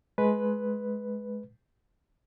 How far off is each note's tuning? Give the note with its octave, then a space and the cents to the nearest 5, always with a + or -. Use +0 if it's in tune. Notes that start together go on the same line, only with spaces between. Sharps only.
G#3 +20 B4 +0